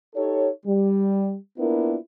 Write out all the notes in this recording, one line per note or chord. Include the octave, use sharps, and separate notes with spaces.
D#4 G4 A4 C#5
G3
A#3 B3 D4 E4 F4 A#4